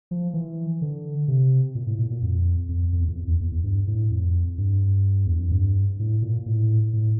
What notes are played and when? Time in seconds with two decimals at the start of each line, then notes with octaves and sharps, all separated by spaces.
0.11 F3
0.34 E3
0.82 D3
1.28 C3
1.75 A#2
1.87 A2
1.99 A#2
2.10 A#2
2.22 F2
2.69 F2
2.93 F2
3.01 E2
3.08 F2
3.16 E2
3.28 E2
3.41 E2
3.52 E2
3.64 G2
3.87 A2
4.10 F2
4.58 G2
5.26 E2
5.38 F2
5.52 G2
5.99 A2
6.22 A#2
6.46 A2
6.93 A2